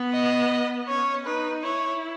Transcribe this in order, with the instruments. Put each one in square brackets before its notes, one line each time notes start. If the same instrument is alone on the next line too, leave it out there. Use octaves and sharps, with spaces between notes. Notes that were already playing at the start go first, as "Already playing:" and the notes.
Already playing: [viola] B3
[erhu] D#5
[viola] C#4 [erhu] C#5
[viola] D#4 [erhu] B4
[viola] E4 [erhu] C#5